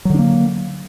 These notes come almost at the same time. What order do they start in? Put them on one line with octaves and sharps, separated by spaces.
F#3 D3 D4 A#3